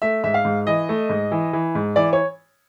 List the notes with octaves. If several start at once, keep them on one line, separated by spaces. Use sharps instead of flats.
A3 E5
G#2 E5
F5
G#2
E3 D#5
A3
G#2
E3
E3
G#2
E3 D5
C#5